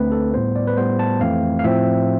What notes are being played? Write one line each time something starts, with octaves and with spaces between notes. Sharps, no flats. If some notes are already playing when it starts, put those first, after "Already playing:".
Already playing: D2 D3 A3 C4 B4
A4
A2 G3 B3 C5
D5
B4
A2 G3 B3 C5
A5
F2 E3 A3 C4 F5
F5
A2 F3 C4 E5